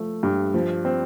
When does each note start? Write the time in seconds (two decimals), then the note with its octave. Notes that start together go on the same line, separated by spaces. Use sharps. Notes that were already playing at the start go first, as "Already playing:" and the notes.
Already playing: F3 A3
0.23 G2
0.54 F3
0.85 C4